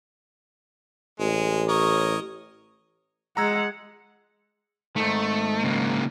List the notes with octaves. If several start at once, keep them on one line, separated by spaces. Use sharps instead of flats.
A1 G#3
A#4 C#5 D#5
G#3 F#5 A#5 E6 G#6
G#2 D#3 A3
C#3 A#3